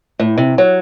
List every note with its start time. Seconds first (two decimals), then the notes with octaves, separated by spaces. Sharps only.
0.19 A2
0.37 C3
0.58 F#3